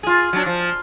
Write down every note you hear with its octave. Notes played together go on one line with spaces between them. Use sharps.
F4 G#4
F#3 D4
F3